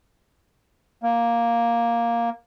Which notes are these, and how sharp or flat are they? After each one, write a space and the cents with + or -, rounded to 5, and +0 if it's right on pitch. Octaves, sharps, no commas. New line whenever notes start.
A#3 +5